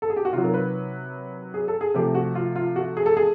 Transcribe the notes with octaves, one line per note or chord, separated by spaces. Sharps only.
A4
G#4
G4
F#4
C3 D#3 F#3 F4
A#4
B4
G#4
A4
G#4
C3 F3 A3 G4
F#4
F4
F4
F#4
G#4
A4
G#4